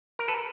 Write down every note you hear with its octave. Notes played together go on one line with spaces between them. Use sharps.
A#4
A4 B4